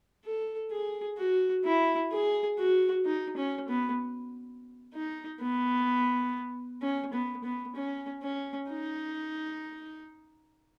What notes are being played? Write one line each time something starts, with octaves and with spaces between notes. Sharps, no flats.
A4
G#4
F#4
E4
G#4
F#4
D#4
C#4
B3
D#4
B3
C#4
B3
B3
C#4
C#4
D#4